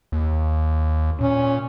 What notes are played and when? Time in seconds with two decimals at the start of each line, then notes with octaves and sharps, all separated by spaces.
0.12 D#2
1.21 A#2 C#4